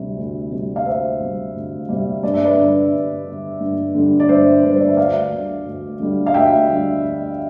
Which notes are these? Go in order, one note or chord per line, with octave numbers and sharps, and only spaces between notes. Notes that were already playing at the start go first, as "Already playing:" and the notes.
Already playing: D2 C3 G3
D2
C3 G3
F5
D2 C5 E5
C3 G3
D2
C3 G3
G2 D5
E5
B4 D5
D3 G3
G2
D3 G3
G2
D3 G3
D5
G2 C5 E5
D3 G3 B4
C5
D5
E5
D2 D5 F5
D3 G3
D2
D3 G3
F5
D2 E5 G5
D3 G3
D2